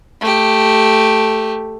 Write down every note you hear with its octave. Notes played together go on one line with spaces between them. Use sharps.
A3 G4